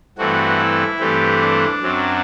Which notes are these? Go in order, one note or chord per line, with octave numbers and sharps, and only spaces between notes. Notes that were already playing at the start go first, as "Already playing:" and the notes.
G2 E3 A3 C4 F#4
E4
G2 E3 A3 C4 G4
D4
F#2 F#3 C4